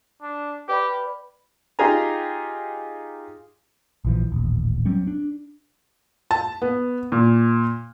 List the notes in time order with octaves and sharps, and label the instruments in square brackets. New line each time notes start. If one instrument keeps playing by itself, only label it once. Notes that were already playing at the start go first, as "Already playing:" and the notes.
[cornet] D4
[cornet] G4 [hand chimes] B4 D5 B5
[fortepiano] D#4 F4 G4 G#4 G#5 A#5
[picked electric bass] A#1 E3 F3
D#1 A1
F#3 G3 C4 C#4
D4
[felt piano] A5
B3
A#2